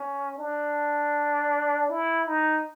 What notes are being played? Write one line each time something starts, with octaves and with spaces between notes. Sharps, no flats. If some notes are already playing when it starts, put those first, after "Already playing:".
Already playing: C#4
D4
E4
D#4